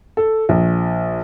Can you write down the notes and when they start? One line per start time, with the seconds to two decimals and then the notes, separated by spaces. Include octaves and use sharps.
0.17 A4
0.49 A#1